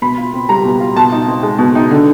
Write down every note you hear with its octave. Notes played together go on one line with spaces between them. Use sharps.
B2 B5
F4
C4
G3 A#5
B2
F4
B2 A5
D#4
C4
G#3
B2
D#4
D3